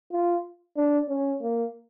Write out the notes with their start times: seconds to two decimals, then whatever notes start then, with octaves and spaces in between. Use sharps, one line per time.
0.12 F4
0.77 D4
1.09 C#4
1.42 A#3